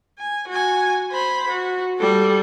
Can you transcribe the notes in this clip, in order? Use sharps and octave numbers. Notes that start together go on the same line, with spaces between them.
G#5
F#4 G#5
C5 B5
F#4
G3 A4